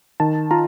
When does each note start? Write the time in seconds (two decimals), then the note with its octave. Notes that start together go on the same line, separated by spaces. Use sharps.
0.20 D#3 A5
0.51 F4 A#5